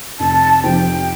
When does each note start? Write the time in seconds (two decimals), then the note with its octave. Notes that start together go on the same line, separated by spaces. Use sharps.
0.20 F1 A5
0.64 F2 C3 F3 C4 G5